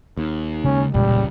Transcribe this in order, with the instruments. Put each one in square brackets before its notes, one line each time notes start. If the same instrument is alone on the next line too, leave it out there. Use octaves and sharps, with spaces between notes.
[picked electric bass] D#2
[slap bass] C#3 G#3 [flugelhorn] C#4
[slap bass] E1 A#2 [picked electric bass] C#2 [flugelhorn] G3